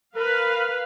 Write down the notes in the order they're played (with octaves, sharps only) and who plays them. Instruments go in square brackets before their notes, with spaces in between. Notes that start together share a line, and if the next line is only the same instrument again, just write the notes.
[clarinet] A#4 [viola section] B4 F5